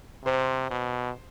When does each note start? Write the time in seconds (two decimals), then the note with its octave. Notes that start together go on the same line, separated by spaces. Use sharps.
0.25 C3 C5
0.70 B2